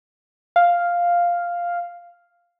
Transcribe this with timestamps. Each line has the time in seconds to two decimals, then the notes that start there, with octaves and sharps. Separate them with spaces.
0.56 F5